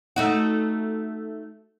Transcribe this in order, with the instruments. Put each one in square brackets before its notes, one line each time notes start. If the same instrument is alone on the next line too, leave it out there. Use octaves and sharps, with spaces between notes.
[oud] A3 D#4 F#4